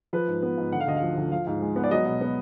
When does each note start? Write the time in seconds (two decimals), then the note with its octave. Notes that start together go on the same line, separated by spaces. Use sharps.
0.13 F3 B4
0.28 G#2
0.42 B3
0.58 G#2
0.72 D3 F#5
0.80 F5
0.87 D2 D#5
0.97 F5
1.02 F3
1.17 D2
1.31 F3 F5
1.47 G#2
1.62 G#3
1.76 B3
1.84 D5
1.91 F#3 D#5
2.06 B2
2.21 B3